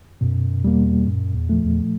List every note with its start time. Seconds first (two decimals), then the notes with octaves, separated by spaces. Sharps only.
0.21 F#2 B2
0.64 E2 G3 A#3
1.07 F#2 A#2
1.35 E2
1.49 F3 A3
1.64 E2